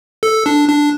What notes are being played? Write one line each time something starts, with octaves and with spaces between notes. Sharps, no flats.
A4
D4
D4